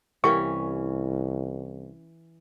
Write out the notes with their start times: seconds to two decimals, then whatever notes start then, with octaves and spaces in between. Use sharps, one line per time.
0.24 C2 E3 G3 A#3 C#4 G5 C#6